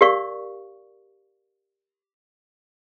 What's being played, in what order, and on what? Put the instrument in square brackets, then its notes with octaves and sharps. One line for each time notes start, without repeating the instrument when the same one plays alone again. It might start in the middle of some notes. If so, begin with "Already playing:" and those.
[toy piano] G4 A#4 D5 F5 C#6